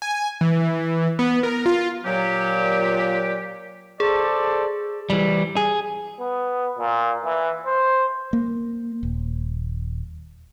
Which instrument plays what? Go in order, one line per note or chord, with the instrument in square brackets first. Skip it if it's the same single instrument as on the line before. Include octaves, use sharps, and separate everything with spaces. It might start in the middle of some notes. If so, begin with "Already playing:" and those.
[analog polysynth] G#5
E3
B3
A#4
F4
[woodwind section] A#2 F#3 G4
[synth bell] G#4 [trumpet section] A4 C5 D5
[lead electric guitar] E3 G3
G#4
[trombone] B3
A#2
E3
C5
[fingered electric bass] A#3
D#1